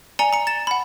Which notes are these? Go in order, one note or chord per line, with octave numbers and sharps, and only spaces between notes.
D5 G#5 A#5 C#7 F7 G7
A#5 C#7
A6 E7
F#5 B5